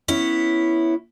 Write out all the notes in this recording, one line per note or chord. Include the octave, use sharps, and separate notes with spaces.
B3 C#4 E4